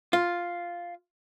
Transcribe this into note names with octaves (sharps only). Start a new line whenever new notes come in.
F4